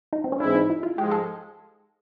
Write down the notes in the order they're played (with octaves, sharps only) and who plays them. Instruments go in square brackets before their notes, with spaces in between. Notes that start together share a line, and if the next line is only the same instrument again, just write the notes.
[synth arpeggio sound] D#4
C4
C#4
[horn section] G#2 E3 G#3 C4 E4 [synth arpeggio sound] D4
[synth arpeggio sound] D#4
E4
F4
[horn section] G#2 F3 G#3 [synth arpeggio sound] G4
[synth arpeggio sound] A4